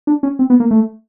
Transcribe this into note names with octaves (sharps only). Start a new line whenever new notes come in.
D4
C#4
C4
B3
A#3
A3